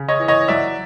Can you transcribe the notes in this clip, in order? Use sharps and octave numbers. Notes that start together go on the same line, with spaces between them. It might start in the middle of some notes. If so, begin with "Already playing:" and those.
Already playing: C#3
C#5 D#5
E3
C#5 D#5
F#3 D5 E5